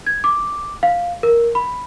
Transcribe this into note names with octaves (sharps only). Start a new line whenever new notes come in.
G#6
D6
F5
A#4
B5